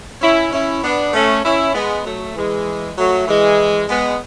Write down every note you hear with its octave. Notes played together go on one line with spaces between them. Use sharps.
C#4 E4
C#4 E4
B3 D4
A3 C#4
C#4 E4
G#3 B3
F#3 A3
E3 G#3
F#3 A3
E3 G#3
G#3 B3